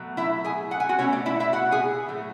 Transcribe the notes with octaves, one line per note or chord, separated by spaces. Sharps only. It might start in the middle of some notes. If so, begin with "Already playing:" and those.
Already playing: B2 F#3 A3
E4 E5
G#4 G#5
F#5
G#5
F#4 F#5
B2 A3 C#4 C#5
D4 D5
E4 E5
E4 E5
F#4 F#5
G#4 G#5
A2 F#3 A3